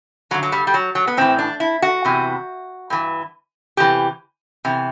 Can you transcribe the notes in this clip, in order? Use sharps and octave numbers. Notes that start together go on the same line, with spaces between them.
G2 D3 F#3
F#3
G3
G3
F#3
F#3
B3
A2 E3 C4
D4
E4
F#4
E2 C3 E3
G2 E3
E2 C3 E3 G4
E2 C3 E3